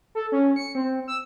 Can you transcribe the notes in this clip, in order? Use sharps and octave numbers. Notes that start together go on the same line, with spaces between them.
A4
C#4
C#7
C4
E6